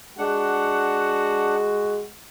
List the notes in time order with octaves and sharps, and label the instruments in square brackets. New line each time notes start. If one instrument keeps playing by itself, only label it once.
[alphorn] G#3 [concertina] D4 F#5 [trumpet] F#4